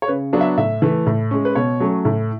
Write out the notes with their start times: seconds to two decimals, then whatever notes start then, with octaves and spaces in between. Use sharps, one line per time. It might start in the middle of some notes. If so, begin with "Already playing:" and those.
0.02 C#5
0.08 C#3 B4
0.33 F#3 B3 D4
0.41 E5
0.58 A2 E5
0.82 E3 A3
1.07 A2
1.31 G#3 C#4
1.45 B4
1.55 B2 C#5
1.80 F#3 A3 C#4
2.05 A2